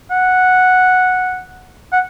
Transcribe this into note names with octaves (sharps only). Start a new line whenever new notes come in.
F#5
F#5